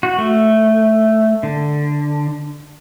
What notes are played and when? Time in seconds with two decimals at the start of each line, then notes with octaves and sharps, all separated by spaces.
0.03 F#4
0.19 A3
1.43 D3